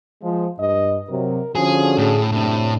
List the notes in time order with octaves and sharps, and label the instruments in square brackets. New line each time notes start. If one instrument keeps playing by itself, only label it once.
[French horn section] F3 [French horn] G#3
[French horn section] G2 [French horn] D#5
[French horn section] C3 F#3 [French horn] A#4
[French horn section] D3 C#4 F#4 [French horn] F3 [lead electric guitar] G#4
[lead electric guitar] A2 [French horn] G#4
[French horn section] F#2 D4 [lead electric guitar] A2 [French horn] C3